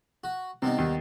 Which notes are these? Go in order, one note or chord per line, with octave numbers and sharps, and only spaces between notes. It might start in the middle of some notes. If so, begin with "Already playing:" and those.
F#4
C3 G3 B3 D#4
D#2